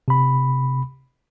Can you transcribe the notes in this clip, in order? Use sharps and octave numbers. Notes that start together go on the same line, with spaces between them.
C3 B5